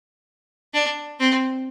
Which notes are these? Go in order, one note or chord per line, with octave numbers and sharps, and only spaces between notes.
D4
C4